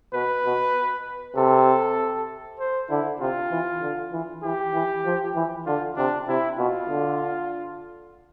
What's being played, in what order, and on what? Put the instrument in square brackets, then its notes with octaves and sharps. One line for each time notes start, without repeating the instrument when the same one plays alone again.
[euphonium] B2 [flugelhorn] B4
[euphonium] B2
[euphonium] C3 [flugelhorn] A4
[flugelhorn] C5
[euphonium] D3 [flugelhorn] E4
[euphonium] C3 [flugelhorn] F4
[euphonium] E3
D3
E3
[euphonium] E3 [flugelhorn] G4
[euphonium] E3
F3
E3
[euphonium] D3 [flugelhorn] F4
[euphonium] C3 [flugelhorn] D4
[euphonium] C3 [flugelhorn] E4
[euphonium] B2 [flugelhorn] F4
[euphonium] D3